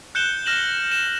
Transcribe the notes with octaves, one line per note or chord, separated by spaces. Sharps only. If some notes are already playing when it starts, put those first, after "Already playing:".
F#6 G6 C#7 E7 G7
F6 A#6 E7 F#7
E7